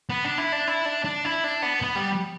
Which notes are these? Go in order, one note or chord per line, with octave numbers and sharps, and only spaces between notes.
B3
D4
E4
D4
E4
D4
D4
E4
D4
B3
B3
G3